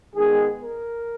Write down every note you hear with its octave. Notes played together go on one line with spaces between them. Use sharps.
D#3 G#3 B3 G#4
A#4